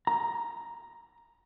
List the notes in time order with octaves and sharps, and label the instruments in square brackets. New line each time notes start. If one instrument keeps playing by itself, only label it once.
[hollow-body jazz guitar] A#5